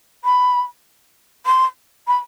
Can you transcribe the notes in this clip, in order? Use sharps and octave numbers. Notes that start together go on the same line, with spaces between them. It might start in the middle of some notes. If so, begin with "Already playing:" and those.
B5
C6
B5